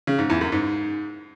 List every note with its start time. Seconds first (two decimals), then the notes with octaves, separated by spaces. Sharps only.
0.07 C#3
0.19 G#2
0.30 E2
0.41 F#2
0.52 G#2